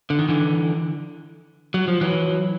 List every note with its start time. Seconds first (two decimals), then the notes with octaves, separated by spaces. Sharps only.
0.10 D3
0.19 D#3
0.29 D3 E3
1.74 F#3
1.88 F3
2.01 E3 F#3